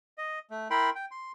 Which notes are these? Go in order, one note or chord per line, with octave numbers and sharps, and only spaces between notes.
D#5
A3
E4 A#4 G5 B5 C6
G5
C6